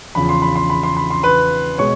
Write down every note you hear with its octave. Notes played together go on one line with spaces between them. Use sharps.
E2 C#3 F3 B5
C6
B5
C6
B5
C6
B5
C6
B4 B5
B2 G#3 C#5 C#6